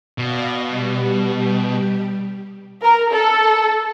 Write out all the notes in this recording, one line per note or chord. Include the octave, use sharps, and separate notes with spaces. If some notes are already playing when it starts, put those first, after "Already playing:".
B2 D5 F5 A#6
G3 G4
A#4
A4